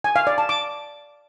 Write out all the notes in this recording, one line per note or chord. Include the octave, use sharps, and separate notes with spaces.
G#5
F5
D5
A5
D6